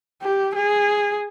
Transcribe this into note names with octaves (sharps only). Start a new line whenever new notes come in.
G4
G#4